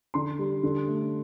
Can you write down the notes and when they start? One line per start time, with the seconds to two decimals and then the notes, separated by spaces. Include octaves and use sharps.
0.14 D3 C6
0.39 G3
0.63 D3
0.87 A3